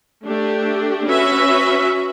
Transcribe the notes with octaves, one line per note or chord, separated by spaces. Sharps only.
A3 D4 G4
C#4 F#4 B4 E5